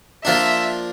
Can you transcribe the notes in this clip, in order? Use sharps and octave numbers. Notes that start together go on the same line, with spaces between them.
F3 A#3 D4 E5